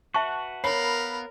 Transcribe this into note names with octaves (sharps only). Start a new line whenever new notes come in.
F#4 B4 E5 F#5 A5 C#6
B3 A#4 C#5 F5 B5